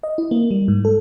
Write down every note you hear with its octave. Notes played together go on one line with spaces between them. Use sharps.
D#5
E4
A#3
G3
G#2
A4